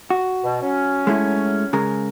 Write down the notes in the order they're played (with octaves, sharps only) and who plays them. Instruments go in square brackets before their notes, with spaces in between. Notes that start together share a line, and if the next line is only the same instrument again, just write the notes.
[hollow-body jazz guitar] F#4
[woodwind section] B2
F#3 C#4
[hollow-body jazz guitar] G#3 A3 E4
C#3 G#3 A#4